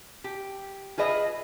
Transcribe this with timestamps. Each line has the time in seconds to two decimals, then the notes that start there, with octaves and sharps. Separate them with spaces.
0.24 G4
0.98 F4 G#4 B4 D#5 E5